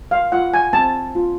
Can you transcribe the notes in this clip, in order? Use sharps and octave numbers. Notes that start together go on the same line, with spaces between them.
F5
F4 F#5
G#5
C4 A5
F4